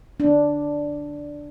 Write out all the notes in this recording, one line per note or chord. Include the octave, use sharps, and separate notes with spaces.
D4